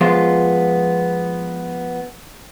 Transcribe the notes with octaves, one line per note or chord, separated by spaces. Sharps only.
F3 G#3 B3 F4